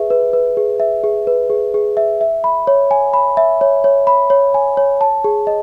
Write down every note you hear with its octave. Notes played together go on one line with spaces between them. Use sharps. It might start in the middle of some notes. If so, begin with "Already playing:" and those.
Already playing: G#4 B4 E5
B4
B4
G#4
E5
G#4
B4
G#4
G#4
E5
E5
B5
C#5
G#5
B5
E5
C#5
C#5
B5
C#5
G#5
C#5
A5
G#4
D#5